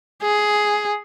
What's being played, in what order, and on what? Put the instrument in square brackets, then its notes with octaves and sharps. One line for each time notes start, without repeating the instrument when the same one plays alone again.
[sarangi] G#4